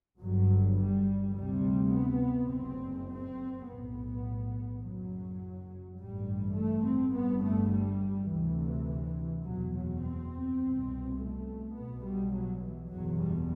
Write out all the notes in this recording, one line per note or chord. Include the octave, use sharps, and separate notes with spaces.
G1 G2 F#3
G3
D2 C3 G3
B3
F#1 F#2 C4
C4
B1 A2 B3
F#1 F#2 F#3
A1 G2 G3
A3
C4
G1 G2 B3
A3
G3
D2 C3 E3
F#1 E2 B2 F#3
F#3
C4
C2 B2
A3
B1 B2 B3
G3
F#3
E3
F#1 E2 B2 F#3
G3